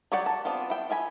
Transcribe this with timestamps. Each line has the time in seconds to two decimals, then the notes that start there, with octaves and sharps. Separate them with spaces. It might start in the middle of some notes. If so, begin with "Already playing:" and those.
0.12 F#3 G4 C#5 D5 F#5
0.26 A5
0.45 B3 C4 D4 F4
0.70 E4 G5
0.90 F4 E5 G#5 B5